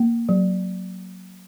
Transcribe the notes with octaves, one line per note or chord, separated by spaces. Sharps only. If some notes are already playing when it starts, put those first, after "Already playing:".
Already playing: A#3
F#3